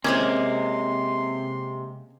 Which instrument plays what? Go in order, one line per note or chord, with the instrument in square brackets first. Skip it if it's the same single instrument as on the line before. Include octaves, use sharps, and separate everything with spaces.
[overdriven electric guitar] C3 C4 [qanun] G#3 A#3 [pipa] C#4 G#4 C5 [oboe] C6